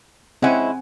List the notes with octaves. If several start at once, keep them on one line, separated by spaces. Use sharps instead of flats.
G#3 C4 C#4 E4 F#5 G#5